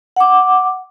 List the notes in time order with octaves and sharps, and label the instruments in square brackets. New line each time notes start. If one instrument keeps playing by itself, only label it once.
[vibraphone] F#5 D6